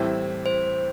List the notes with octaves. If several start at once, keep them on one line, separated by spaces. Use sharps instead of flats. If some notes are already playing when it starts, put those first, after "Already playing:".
Already playing: A2 E3 G3 C4 E4
C5